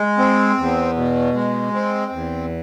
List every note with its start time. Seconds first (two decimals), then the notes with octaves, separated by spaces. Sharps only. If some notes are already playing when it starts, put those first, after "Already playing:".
Already playing: G#3
0.18 C4
0.57 E2
0.96 B2
1.34 G#3
1.73 C4
2.12 E2